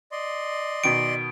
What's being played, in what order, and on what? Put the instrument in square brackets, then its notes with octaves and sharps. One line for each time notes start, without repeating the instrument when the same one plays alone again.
[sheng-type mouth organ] D5 D#5 C6
[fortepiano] B2 D#3 [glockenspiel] D7